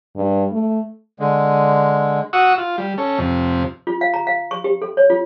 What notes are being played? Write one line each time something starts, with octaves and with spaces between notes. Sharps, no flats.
G2
A3
D3 G#3
F#4 F#5 C#6 D#6 E6
F4
G3
C#4 A4
F2 C3
F4
F5
A#5
F5
C#6
G4
A4
C#5
F4